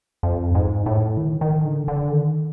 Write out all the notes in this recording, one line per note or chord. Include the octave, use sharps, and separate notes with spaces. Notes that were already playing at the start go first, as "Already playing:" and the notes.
F2
G#2
A2
D#3
D#3
D3
D3
D#3